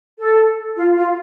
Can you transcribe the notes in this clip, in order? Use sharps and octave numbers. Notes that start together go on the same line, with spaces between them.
A4
F4
F4